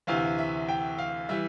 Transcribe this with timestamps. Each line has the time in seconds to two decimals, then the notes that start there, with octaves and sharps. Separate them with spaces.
0.07 D2 C3 E3 F5
0.38 E5
0.69 G5
0.98 F5
1.29 E3 G3 E5